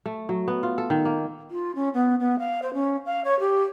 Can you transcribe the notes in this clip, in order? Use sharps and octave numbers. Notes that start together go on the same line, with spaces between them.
A3
F#3
B3
F4
A4
D#3
A#3
F4
C#4
B3
B3
F5
C5
C#4
F5
C#5
G4